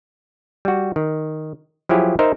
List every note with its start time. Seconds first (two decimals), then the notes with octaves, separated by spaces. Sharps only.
0.65 G3 F#4
0.96 D#3
1.89 F3 F#3 E4 G4 G#4
2.19 D#4 A#4 C5 E5